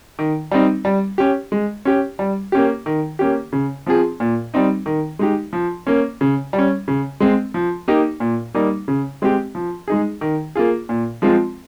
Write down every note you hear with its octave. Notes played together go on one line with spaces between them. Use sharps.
D#3
G3 C4 D#4
G3
C#4 G4
G#3
C#4 G4
G3
A#3 C#4 G4
D#3
A#3 C#4 G4
C#3
F3 C4 F4 G#4
A#2
G3 C4 D#4
D#3
G#3 D#4 G4
F3
A#3 C#4
C#3
G3
C#4
C#3
G#3 C4
F3
A#3 D#4 G4
A#2
G3 A#3 D#4
C#3
G#3 C4 G4
F3
G#3 D#4 G#4
D#3
A#3 F4 G#4
A#2
F3 G#3 C4 F4